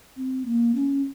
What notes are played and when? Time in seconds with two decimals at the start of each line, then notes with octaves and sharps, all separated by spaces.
0.17 C4
0.46 A#3
0.75 C#4